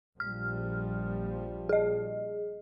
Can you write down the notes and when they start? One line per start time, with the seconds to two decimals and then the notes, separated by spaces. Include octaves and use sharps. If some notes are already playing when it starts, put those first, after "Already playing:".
0.20 A#1 F3 G3 F6
1.69 G#4 D#5